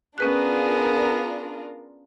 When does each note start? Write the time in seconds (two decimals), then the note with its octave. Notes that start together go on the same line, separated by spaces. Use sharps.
0.18 B3 C#4 D4 F4 G#4 A#4 B4 F#6